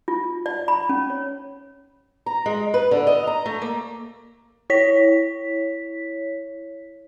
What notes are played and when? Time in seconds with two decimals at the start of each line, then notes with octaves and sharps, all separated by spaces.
0.08 F4
0.46 D5
0.68 B5
0.89 C#4
1.10 C#5
2.26 A#5
2.46 G#3
2.74 B4
2.91 D3
3.07 D#5
3.27 A#5
3.46 A3
3.62 A#3
4.70 E4 C#5 B6